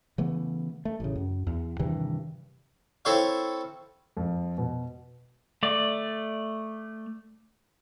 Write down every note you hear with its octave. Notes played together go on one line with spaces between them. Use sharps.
C#3 E3 A3 B3
A3
A1 C#3
F#2
E2
G2 C3 D#3 E3
C4 E4 A4 C5 C#5 F5
F2
B2
A3 D5